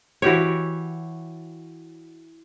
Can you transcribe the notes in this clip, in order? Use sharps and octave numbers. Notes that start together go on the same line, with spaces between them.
E3 F#4 G4 C#5